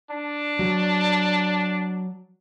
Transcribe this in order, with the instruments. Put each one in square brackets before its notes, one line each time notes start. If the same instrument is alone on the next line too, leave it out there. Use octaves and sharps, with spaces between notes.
[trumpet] D4
[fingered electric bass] F#3